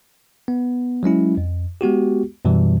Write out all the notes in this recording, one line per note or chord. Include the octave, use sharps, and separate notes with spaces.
B3
F#3 G#3 C#4 E4
F2
G#3 B3 F#4 G4
F#2 B2 E3 G3